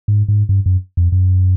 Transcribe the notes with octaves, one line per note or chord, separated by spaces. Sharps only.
G#2
G#2
G2
F#2
F2
F#2